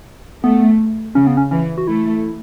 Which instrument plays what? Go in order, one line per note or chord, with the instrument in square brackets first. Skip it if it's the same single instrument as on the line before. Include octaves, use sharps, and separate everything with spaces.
[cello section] A3 [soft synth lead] B3
[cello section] C#3 [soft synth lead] C#4
[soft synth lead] B3
C#4
[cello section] E3 [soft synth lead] C#4
[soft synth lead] F#4
[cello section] A3 [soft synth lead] E4